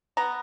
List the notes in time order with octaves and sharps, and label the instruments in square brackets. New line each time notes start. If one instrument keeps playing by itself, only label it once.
[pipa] B3 A#5